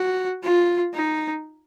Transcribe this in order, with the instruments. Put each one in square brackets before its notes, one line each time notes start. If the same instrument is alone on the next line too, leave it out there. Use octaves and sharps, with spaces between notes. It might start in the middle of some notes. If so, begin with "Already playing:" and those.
Already playing: [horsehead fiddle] F#4
F4
D#4